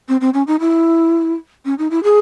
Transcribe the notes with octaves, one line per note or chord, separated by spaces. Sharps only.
C4
C4
C#4
D#4
E4
C#4
D#4
E4
G#4